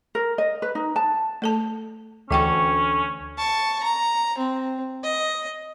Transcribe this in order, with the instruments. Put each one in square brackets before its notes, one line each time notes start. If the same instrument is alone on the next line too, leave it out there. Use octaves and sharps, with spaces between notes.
[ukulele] A#4
D#5
B4
D#4
A5
[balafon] A3 A4 A5
[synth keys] D2 A4 [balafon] E3 G5 C#6 [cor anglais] C#4
[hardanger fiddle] A5 C#6
A#5
C4
D#5